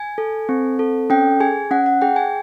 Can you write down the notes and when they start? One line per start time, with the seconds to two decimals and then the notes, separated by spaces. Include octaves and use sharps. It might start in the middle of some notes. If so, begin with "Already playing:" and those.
Already playing: G#5
0.18 A4
0.49 C4
0.79 A4
1.10 C#4 G5
1.40 G#4 G#5
1.71 C#4 F#5
1.86 F#5
2.02 G#4 G5
2.16 G#5